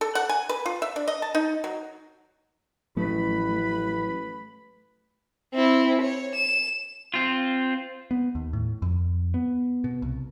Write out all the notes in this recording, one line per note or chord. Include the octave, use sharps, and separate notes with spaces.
A4
F#5
G#5
B4
F4
E5
D4
D#5
A5
D#4
F#3
A1 F3 F#3 A3 E4 B4 B5
C4 E4
C#5
E7
C4 F4
B3
D#2
A2
F2
B3
B2
C2